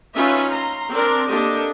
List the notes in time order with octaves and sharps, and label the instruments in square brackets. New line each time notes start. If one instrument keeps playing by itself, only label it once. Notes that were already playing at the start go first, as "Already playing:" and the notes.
[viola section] C#4 D#4 F4 B4 E5
A#5 C6
C4 D4 A#4
A#3 D4 G4 A4 D#5